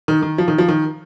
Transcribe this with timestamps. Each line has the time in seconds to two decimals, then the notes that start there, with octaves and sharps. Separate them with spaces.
0.08 D#3
0.22 D#3
0.38 F3
0.48 D#3
0.58 F3
0.68 D#3